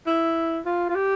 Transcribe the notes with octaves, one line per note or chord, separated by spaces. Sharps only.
E4
F4
F4
G4